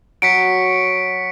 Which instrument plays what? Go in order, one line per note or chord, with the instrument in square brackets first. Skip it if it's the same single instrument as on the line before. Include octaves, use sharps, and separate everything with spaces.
[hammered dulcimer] F#3 [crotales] B6 C#7 D7